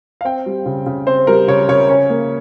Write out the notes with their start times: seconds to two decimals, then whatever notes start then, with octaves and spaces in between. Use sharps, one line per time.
0.21 F5
0.25 C4 G5
0.46 G3
0.66 C#3
0.86 C#3
1.07 C4 C5
1.27 G3 A#4
1.48 C#3 C#5
1.68 C#3 C#5
1.89 C#4 C#5
2.10 A#3